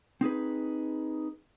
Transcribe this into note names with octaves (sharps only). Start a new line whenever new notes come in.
C4 D#4 G#4 B4